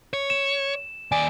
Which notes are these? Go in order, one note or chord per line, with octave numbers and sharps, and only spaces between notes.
C#5
E7
D#2 D5 G#5